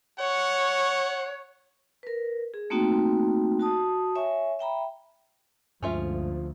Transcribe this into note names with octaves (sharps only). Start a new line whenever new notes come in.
C#5 F#5
A#4 B4
G#4
A3 A#3 C4 D#4 F#4 G5
F#4 A5 D#6
C#5 E5 G#5 C#6
E5 G5 A#5 B5
D2 G2 F3 G#3 C#4 F4 E5